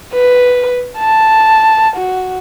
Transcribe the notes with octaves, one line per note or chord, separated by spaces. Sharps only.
B4
A5
F#4